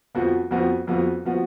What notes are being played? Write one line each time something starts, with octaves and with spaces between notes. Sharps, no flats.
F2 F3 B3 F#4
F2 F3 B3 F#4
F2 F3 B3 F#4
F3 B3 F#4